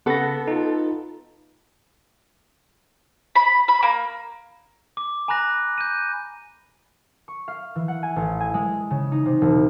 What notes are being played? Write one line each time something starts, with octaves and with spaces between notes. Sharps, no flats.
C#3 B3 A4 A#6
D#4 F4
B5
B5
A#3
D6
G#5 A#5 B5 F#6 A#6
G6 D#7
C#6
F5
E3
F#5
G#5
A1
G#5
G#3
C#3
D#4
C3
E1